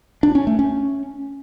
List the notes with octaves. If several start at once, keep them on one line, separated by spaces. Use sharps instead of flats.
D4
C#4
A3
C#4